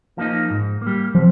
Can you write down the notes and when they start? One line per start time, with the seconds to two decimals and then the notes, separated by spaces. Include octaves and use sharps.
0.18 F3 A#3 D#4
0.50 G#2
0.82 G3 A#3
1.15 C3 F3